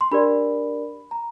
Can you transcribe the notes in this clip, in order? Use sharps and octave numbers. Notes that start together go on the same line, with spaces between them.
C6
D4 G4 A#4 D5 B5
A#5